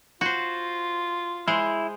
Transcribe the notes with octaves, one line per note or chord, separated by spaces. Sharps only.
F4 F#4 C5
G#3 E4 C5